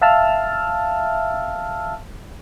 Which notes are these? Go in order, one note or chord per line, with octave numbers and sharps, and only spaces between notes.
E5 F5 A5 E6 F6